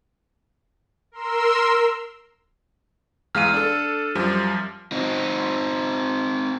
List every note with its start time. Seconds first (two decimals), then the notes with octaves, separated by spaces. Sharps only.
1.12 A#4 C6 E6
3.35 E2 G#3 F5 F6 D#7
3.54 D4 A4
4.15 F#2 F3 G3
4.92 C4 D#4